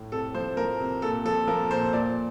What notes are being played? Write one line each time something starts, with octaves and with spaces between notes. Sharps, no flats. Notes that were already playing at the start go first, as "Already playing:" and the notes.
Already playing: A2
C3 A4
F3 C5
F3 A#4
C3
A#2 A4
F3 A4
F3 A#4
A#2 C5
A#2 D5